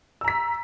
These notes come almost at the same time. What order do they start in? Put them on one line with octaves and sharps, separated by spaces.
E6 A#5 B6